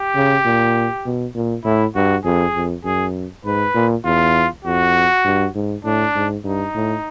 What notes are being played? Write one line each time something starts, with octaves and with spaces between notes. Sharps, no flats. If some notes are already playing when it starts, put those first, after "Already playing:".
Already playing: G4
C#3
A#2
B2
A#2
A2 E4
G2 F#4
F2 G#4
F2
F#2 G#4
G#2 B4
A#2
E2 F4
F2 F#4
G2
G#2
A2 D4
G#2
G2 D#4
A2